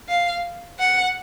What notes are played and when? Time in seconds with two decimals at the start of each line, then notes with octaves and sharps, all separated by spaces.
0.08 F5
0.79 F#5